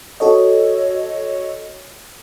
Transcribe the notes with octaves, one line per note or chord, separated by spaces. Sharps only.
F#4 A4 C#5 D#5